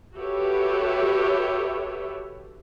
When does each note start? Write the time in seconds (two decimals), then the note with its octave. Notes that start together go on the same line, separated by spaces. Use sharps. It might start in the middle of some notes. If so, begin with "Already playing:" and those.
0.17 F#4 G4 A4 B4 C#5 E5